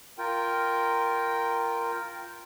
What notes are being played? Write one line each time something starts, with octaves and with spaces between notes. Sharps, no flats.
F4 A#4 G5